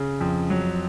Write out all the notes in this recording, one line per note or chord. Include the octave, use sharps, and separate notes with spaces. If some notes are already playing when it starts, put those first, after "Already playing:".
Already playing: C#3
F2
F#3